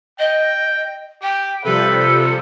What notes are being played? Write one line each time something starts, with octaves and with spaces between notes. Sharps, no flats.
D#5 G5
G4 G5
C3 F3 G3 A4 B4